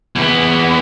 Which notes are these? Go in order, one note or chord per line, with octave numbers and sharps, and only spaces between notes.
E2 B3